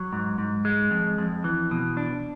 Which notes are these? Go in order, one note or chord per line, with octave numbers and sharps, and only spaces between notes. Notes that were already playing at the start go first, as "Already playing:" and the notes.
Already playing: F#3
G#2
G#2
G#3
F2
F2
E3
B2
D4